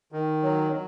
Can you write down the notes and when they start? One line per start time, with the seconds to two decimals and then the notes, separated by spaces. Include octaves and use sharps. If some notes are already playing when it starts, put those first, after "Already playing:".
0.12 D#3
0.42 F#3
0.72 F#3